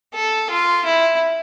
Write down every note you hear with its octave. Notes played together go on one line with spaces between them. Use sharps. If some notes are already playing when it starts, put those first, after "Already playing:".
A4
F4
E4